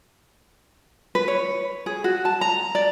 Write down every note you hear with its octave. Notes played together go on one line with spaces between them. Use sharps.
B4
C#5
G#4
F#4
A5
A#5
D5